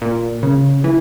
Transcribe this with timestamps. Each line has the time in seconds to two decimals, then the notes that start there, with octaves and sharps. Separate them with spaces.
0.02 A#2
0.43 C#3
0.84 E3